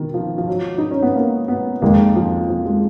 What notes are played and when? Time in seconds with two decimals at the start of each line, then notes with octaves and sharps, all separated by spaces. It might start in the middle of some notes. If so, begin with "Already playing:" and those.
Already playing: B2 D#3
0.14 F3
0.38 F3
0.48 F#3
0.78 D#4
0.91 C#4
1.02 B3
1.15 A#3
1.48 B3
1.82 F2 D#3 G#3 A#3
2.16 F3
2.49 F3
2.66 G#3